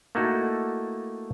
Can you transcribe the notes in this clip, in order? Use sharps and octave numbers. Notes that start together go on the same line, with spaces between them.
A3 A#3 D#4 E4 F#4 A4